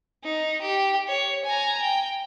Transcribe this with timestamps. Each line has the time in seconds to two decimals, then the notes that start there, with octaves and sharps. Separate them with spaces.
0.24 D#4
0.61 G4
1.08 C#5
1.45 G#5 A#5
1.82 G5